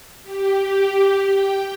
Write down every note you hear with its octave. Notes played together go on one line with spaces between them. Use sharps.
G4
G5